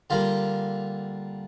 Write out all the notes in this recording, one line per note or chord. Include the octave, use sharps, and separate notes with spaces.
D3 G3 A#3 F4